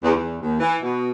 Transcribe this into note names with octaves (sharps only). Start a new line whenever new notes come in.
E2
E2
D#2
E3
B2